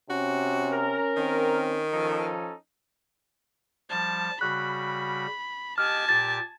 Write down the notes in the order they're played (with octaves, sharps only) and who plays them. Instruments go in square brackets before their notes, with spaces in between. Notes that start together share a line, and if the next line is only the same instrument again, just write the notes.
[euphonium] C3 [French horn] C#4 [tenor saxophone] F#4
[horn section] A#4
[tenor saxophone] D#3 [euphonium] C4
[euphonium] F3 [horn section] C#4 D#4 A4
[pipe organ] F3 G3 [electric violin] A5
[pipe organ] C#3 G3 F#4 [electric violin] B5 [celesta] F#6
[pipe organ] G4 D#5 [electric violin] G#5 A5 [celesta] F6
[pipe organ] A#2 G4 [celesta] A6